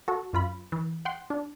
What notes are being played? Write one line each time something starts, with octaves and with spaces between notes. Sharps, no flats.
F#4 A4
F#2 F4 B5
E3
F#5 G5 C6
D4